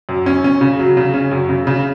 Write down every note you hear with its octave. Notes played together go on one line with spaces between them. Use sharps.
F#2
C#4
C#4
C#3
F#3
C#3
C#4
F#2
C#3
C#3